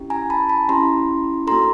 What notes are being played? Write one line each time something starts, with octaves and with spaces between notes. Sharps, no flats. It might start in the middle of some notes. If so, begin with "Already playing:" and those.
Already playing: C#4 E4 G4
G#5 A#5
A5 B5
A5 B5
C#4 E4 G4 A#5 C6
A#3 D4 F#4 A4 A#5 C6